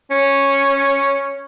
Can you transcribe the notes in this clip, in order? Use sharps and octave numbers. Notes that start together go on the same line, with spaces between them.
C#4